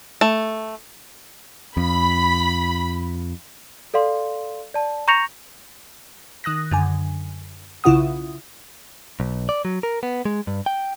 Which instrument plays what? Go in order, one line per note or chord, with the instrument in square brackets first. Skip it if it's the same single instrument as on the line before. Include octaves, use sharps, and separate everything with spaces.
[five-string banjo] A3
[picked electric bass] F2 [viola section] B5
[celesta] A4 D5 F5 C6
D5 A5
A#5 C#6 G6 A#6 C#7 F7
[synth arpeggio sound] D#3 D#6 F#6 A#6
F#2 D3 G#5
B1 C#3 E4 F4 F#5 D#6
[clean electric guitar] B1
D5
F#3
A#4
B3
G#3
G2
G5